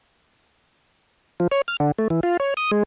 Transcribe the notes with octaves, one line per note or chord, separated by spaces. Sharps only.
F3
C#5
F6
D3
A3
E3
F4
C#5
D#6
G#3